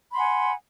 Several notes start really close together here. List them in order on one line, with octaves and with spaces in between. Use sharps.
B5 C6 F#5 G#5